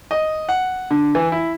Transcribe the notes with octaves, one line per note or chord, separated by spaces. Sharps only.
D#5
F#5
D3
E3
E4